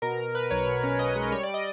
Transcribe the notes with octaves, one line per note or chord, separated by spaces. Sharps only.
B2 A#4
B2
B2 B4
B1 C#5
B2
C#4
B2 D#5
G#3
G3 C#5
D5
G3
D#5